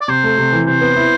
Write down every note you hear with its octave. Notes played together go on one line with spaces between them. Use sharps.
D5
C3 C5
A3
C3
E3
C3 C5
B3
E4